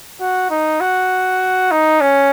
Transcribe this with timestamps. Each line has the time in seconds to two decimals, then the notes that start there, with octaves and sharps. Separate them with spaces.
0.20 F#4
0.50 D#4
0.81 F#4
1.71 D#4
2.01 C#4